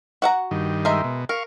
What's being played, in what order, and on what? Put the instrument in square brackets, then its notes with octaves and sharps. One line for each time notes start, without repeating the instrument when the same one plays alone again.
[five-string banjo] F#4 F#5 A#5
[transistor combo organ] G2 D#3
[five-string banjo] G#3 A#4 E5
[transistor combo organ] B2
[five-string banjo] A#4 [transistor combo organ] F5 C#6